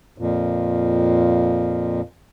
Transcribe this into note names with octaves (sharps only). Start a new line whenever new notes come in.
F2 A#2